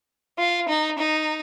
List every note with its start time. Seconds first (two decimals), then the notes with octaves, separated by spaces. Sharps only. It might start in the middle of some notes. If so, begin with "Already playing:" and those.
0.38 F4
0.69 D#4
0.99 D#4